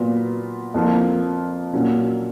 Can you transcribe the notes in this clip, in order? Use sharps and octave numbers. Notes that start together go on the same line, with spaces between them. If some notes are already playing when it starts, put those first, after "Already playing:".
Already playing: A#2 F#3 B3 F4
F2 F3 A#3 F4
A#2 F#3 C#4